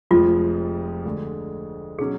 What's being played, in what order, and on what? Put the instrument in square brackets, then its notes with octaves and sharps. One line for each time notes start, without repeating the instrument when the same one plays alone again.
[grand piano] F1 F2 F3 G#3 [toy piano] F4
[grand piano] D2 D3 G#3
[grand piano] B2 F#3 C#4 [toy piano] G#4